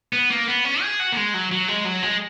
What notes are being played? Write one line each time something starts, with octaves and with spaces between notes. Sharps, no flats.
B3
A#3
B3
C#4
G#4
F#4
A#3
G#3
F#3
F#3
G#3
F#3
G#3